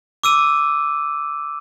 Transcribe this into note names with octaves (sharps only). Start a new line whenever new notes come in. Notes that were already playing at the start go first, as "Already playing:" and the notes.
D6 E6 D#7